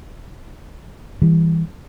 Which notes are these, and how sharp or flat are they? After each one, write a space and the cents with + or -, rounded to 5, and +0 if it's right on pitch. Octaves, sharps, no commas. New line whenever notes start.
E3 +0 G3 +25